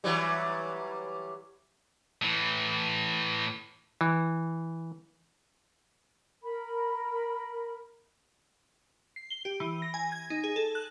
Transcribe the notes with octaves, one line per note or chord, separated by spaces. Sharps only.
E3 F#3 G3
A2 E3
E3
A#4 B5
C7
G7
G4
E3
A#6
G#5
G#6
D#4
G#4
A4
F#6